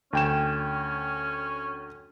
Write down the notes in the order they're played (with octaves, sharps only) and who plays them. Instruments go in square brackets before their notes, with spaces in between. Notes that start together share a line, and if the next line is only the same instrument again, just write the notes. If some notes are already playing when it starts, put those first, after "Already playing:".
[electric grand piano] D2 G5 E7 [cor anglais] C#4